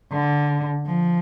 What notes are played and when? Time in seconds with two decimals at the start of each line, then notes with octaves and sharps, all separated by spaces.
0.12 D3
0.86 F3